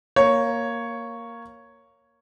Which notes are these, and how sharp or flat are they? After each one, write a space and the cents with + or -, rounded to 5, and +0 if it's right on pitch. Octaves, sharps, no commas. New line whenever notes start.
A#3 +0 C#5 +0